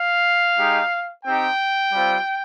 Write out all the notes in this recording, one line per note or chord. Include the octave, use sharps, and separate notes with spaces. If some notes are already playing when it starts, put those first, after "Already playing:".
Already playing: F5
G#3 D#4 G4
C4 D#4 G4 G5
G3 C4 F4